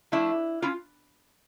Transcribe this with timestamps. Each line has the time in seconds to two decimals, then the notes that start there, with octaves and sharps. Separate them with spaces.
0.12 F3 A3 D4 E4
0.62 C#4 E4 F4